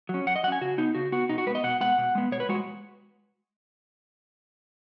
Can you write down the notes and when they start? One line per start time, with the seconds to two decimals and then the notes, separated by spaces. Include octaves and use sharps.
0.09 F#3
0.14 C#4
0.27 F#2 F#5
0.36 D#5
0.43 F#3 F#5
0.47 C#4 G#5
0.61 C#3 F#4
0.78 B3 D#4
0.95 C#3 F#4
1.12 B3 F#4
1.29 B2 D#4
1.38 F#4
1.46 G#3 B4
1.50 B3 D#5
1.63 B2 F#5
1.81 G#3 B3 F#5
1.98 B2
2.15 G#3 B3
2.32 B2 C#5
2.40 B4
2.49 G#3 F#4